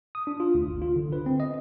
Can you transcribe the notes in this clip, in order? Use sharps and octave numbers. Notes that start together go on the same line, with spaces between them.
D#6
D4
F4
D2
G1
F4
D3
B4
C4
D#5